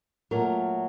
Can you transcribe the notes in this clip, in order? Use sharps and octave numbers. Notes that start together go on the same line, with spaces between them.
A#2 F#3 A3 A#4